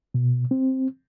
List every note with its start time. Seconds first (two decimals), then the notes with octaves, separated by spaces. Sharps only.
0.14 B2
0.51 C4